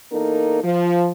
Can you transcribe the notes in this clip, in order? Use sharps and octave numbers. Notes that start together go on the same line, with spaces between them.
E2 A#3 D#4 A4 A#4
F3